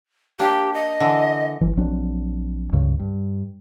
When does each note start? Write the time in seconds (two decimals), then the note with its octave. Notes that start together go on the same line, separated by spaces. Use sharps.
0.39 A#3 D4 G4
0.74 D#5
1.00 D3 E3
1.61 G1 E3
1.77 A#1 F#3 C4 D4
2.72 C#2 G2 C#3
2.99 G2